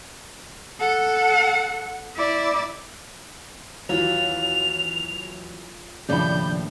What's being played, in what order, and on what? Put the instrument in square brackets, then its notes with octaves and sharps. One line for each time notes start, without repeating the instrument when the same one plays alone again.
[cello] A4 F#5
E4 D5
[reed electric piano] D#2 [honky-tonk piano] E3 F#3 [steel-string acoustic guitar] F4 C#5 [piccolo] F7
[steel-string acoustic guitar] D#2 A2 [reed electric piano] C#3 F3 D4 [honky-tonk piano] D5 B5 [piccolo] G6